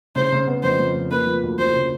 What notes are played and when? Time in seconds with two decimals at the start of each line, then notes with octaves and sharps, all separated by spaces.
0.16 C#3 C5
0.32 C#3
0.47 B3
0.63 F2 C5
0.79 F2
0.95 F2
1.11 A#3 B4
1.27 F3
1.44 D2
1.58 F3 C5
1.75 C#3